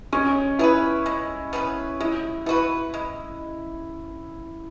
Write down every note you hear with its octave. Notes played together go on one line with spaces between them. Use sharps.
G#3 C#4
B3 E4 G#4 B4
G#3
B3 G#4 B4
G#3 E4
B3 E4 F#4 B4
G#3